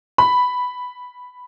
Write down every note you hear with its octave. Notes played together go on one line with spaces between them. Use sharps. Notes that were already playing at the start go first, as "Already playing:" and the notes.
B5